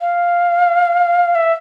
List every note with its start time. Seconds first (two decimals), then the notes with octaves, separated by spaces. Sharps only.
0.01 F5
1.35 E5